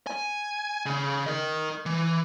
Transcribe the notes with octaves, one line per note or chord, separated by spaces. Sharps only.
G#5
C#3
A#4 D#5
E3